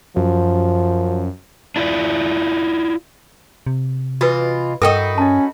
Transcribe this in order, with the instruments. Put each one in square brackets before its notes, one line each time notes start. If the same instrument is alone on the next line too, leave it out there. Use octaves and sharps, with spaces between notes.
[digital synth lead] F#2 [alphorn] F3
[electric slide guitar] D4 E4 F4 D5
[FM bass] C3
[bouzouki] E3 F4 D#5 [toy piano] F#4 B4
[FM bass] G2 [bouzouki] D#4 E4 F#4 [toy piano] A4 A#4 G5
[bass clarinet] C#4 [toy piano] D#5 A5